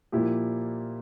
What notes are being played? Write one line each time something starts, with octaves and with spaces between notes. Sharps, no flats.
A#2 F3 A#3 E4 G4